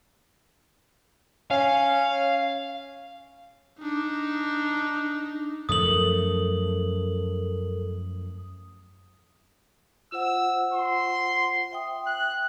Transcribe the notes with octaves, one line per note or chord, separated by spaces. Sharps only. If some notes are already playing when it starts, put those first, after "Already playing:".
C#4 F5
D4 D#4
F#2 F3 A3 A4 A#4 D#6 F#7
F4 C5 F#5 E6
C6
E5 G5 D#6
F#6